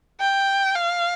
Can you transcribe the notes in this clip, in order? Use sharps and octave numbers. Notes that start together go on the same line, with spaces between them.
G5
F5